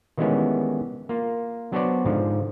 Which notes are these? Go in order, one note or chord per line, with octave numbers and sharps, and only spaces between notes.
D#3 E3 G3 G#3 B3 C#4
A#3 F4
F#3 B3 D4 F#4 C5 D5
G#2 D3 F3